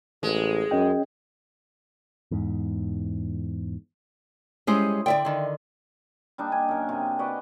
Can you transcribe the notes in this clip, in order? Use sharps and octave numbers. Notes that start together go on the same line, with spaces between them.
A1 G#3
F#2 C#4 D#5 G5
E2 G#2
G3 G#3 C#4 E4 C5 D#6
D3 D5 E5 G5
D3 D#3
G3 A#3 D4 D#4
G#5
F#2 A#4
C3
F#4 B4 D5 D#5